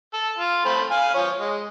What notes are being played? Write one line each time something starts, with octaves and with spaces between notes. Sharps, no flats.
A4
F4
A3 C4 B5
F5 G#5
F3 C#5
G#3